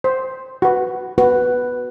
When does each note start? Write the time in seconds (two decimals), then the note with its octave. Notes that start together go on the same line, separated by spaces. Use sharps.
0.04 C5
0.62 F#4 B4
1.18 F#4 B4